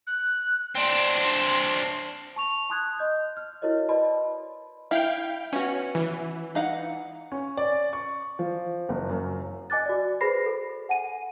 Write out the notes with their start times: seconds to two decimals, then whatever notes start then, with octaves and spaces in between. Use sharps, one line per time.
0.07 F#6
0.75 C4 D4 C6
2.36 A5 C#6 F7
2.70 A5 C6 D#6 F#6 G#6
2.99 D#5 G6
3.37 F6
3.62 E4 F#4 A#4 C#5 D#5
3.89 B4 D5 D#5 A5 B5 C6
4.91 E4 F5 G5
5.53 B3 C#4 F#4
5.95 E3
6.55 D#4 F5 F#5
7.32 C#4
7.57 D5
7.93 C#6
8.39 F3
8.89 F#1
9.09 F#2
9.70 D#5 G#5 D6 F#6 A6
9.86 F#4 D5
10.21 G#4 B4 C5 B5 A#6 C7
10.46 A4
10.89 F#5 G#5 D#7